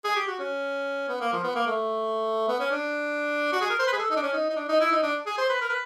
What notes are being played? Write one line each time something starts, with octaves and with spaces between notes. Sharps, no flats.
G#4
G4
F#4
C#4
B3
A#3
F3
B3
A#3
A3
B3
C#4
D4
F#4
G#4
A#4
C5
B4
G#4
A4
D#4
D4
C#4
D#4
D#4
D4
D#4
E4
D#4
D4
G#4
C5
B4
A#4
B4